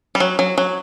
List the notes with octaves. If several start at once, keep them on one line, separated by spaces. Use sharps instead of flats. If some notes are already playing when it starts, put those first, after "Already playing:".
G3
F#3
F#3
F#3